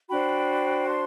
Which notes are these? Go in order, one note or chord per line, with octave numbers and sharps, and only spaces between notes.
D4 F#4 C5 G5 B5
A5 C6